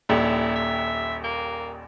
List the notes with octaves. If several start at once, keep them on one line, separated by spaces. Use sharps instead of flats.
D#1 A#1 D#2 E4
E5
A#3